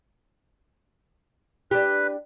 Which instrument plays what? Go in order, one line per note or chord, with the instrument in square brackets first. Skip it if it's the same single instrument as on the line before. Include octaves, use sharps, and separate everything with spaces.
[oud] D4 G4 [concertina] B4